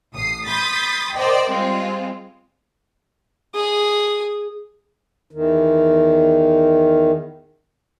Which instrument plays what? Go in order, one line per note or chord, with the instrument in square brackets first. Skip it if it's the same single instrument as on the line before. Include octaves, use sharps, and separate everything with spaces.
[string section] A1 D#6 C7
B5 C6 D#6 G6 A6 B6
A#4 C5 D5 D#5 G5
G3 G#3 C4 F4
[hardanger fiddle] G#4 D#6
[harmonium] E2 D#3